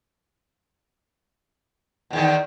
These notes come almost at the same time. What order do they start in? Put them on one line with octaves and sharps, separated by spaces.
B2 E2 D#3